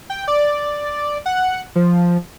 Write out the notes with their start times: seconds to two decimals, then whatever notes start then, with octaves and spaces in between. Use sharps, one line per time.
0.10 G5
0.28 D5
1.26 F#5
1.76 F3